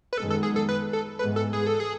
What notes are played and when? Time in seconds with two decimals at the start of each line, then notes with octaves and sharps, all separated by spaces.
0.13 B4
0.18 F#2 D#3 G#3 B3 A4
0.30 A4
0.43 G#4
0.56 A4
0.69 B4
0.93 A4
1.19 G#2 E3 G#3 B3 B4
1.36 A4
1.53 G#4
1.67 A4
1.80 G#4